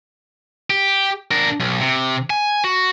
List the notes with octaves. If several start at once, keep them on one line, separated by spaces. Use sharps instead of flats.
G4
D4 A#4
B1
C3
G#5
F#4